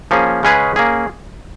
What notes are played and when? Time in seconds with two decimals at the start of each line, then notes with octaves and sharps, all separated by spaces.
0.11 F3 A#3 C#4 G#4
0.43 C#3 G#3 C#4 G#4 B4
0.76 A#3 C#4 G#4